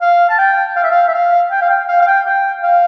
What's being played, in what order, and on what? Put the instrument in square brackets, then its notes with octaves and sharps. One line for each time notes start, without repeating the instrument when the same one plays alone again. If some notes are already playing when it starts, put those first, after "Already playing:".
[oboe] F5
A5
G5
F5
E5
F5
E5
F5
G5
F5
G5
F5
F5
G5
G5
F5